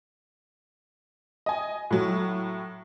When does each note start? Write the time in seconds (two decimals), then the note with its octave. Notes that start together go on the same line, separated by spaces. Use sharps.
1.46 D#5 G#5
1.91 A2 F#3